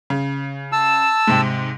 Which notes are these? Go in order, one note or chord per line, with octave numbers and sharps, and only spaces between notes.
C#3
A5 E6
G#2 C3 G5